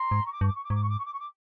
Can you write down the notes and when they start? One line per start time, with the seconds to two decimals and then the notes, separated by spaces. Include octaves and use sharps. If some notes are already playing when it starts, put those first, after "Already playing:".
Already playing: A#5 C6
0.11 G#2
0.25 C#6
0.33 D6
0.41 G2 C#6
0.48 D6
0.55 C#6
0.63 D6
0.69 G#2 C#6
0.76 D6
0.83 C#6
0.90 D6
0.98 C#6
1.04 D6
1.12 C#6
1.19 D6